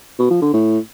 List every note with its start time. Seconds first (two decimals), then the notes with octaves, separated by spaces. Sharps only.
0.19 B2
0.31 F3
0.42 D3
0.54 A2